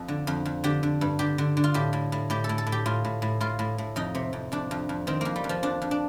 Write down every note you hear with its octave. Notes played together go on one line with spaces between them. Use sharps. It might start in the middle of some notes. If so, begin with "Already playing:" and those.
Already playing: F2
D3
F2
F2
D3 G4
D3
G2
D3 G4
D3
D3
F4
A2 G4
A2
A2
A2 G4
A4
A2
A4
A2
G4
A2 F4
A2
A2
A2 F4
A2
A2
F2 D#4
C3
F2
F2 D4
F2
F2
D#3 C4
F2 A#3
G3
F2
F3
F2 D4
F2
D4